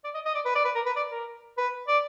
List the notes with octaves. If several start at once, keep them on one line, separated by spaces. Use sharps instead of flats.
D5
D#5
D#5
D5
B4
D5
B4
A#4
B4
D5
A#4
B4
D5